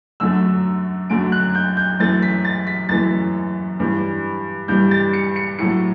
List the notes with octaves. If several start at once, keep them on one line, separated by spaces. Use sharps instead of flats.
F#2 D3 F#3 A3 E6
F#2 D3 F#3 A3 D7
F#6
G6
G6
F#2 E3 A3 A6
B6
A6
B6
F#2 E3 A3 A6
G2 E3 G3
G2 E3 G3 G6
A6
C#7
C#7
A2 F#3 A3 C#7